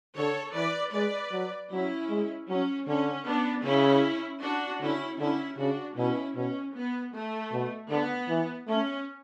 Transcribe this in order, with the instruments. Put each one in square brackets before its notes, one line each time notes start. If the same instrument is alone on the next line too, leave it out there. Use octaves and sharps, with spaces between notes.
[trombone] D3 [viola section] A4 C#5
[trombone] E3 [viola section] B4 D5
[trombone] G#3 [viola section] B4 D5
[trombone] F#3
[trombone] F#3 [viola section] C#4 E4
[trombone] G#3
[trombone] F#3 [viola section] C#4
[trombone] D3 [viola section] C#4
[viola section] B3 D4
[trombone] C#3 [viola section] C#4 E4
[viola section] D4 F#4
[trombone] D3 [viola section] C#4 E4
[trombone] D3 [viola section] C#4 E4
[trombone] C#3 [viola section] D4 F#4
[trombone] B2 [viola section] C#4 E4
[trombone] B2 [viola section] C#4
[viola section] B3
A3
[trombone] B2
[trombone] D3 [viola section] B3
[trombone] E3
[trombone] A3 [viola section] C#4